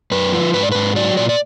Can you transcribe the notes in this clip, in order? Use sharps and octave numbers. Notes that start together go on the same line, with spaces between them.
F#2 B4
F3
G#2 B4
D5
G#2 B4
F#3 D5
A#2 D5
D5